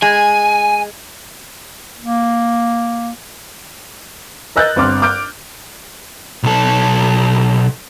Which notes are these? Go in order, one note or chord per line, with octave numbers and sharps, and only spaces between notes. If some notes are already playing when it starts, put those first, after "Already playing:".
G#3 G#5
A#3
A#4 D#5 E6 F#6 G6 A6
G1 C4 D6 F6
D6 F6 G6 D7
B1 A4